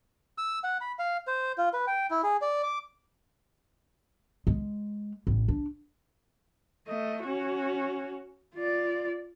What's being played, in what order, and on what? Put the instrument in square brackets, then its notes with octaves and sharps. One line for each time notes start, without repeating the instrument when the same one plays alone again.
[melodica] E6
F#5
B5
F5
C5
F4
B4
G5
E4
G#4
D5
D6
[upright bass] G#3
A1
D4
[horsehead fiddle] A3 D#5
C#4 F#4
F4 D5